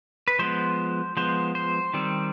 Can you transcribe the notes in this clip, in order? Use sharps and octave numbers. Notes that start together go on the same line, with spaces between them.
B4
F3 G#3 B3 C5
F3 G#3 B3 C5
C5
D#3 G3 C4